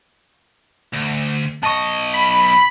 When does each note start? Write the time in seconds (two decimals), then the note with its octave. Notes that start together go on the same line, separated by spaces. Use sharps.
0.94 D2
1.63 B1 D#5 A5 C#6
2.14 B5